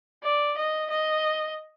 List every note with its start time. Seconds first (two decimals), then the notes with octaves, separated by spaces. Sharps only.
0.24 D5
0.57 D#5
0.90 D#5